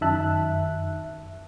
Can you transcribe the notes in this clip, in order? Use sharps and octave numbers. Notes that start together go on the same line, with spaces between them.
F#2 D#3 E5 A5 F#6